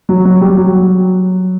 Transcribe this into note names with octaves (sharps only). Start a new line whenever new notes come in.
F#3
F#3
G3
F#3